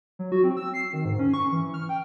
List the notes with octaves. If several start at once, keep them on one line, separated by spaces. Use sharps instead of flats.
F#3
F#4
C4
E6
C7
D#3
G#2
C#4
C#6
E3
F6
G5